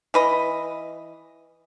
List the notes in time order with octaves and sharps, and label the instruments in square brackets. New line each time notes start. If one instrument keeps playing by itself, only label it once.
[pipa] E3 B4 D#5